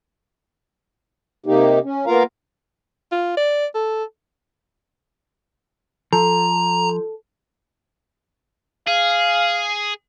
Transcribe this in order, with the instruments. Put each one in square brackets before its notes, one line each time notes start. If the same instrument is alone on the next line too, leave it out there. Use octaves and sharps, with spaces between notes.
[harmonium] C3 A#3 D#4 G4
C#4
A#3 B3 F4 A#4 F5 A#5
[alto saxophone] F4
D5
A4
[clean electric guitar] F3 [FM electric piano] A4 [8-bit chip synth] A#5
[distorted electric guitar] G#4 [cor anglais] F5